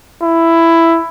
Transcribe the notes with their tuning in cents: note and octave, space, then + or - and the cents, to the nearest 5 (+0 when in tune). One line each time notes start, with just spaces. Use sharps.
E4 +10